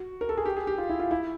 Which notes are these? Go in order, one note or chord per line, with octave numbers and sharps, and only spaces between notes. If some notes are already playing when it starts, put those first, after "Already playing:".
Already playing: F#4
A#4
A4
G#4
G4
G#4
G4
F4
E4
F4
E4